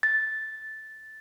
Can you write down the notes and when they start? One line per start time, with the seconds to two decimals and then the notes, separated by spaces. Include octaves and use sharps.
0.03 A6